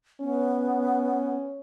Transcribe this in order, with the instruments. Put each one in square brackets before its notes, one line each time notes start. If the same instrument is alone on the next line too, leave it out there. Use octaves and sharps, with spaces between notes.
[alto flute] B3 [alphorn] C#4